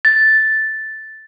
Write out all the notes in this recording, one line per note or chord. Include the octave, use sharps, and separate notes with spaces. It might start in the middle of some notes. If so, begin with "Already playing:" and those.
A6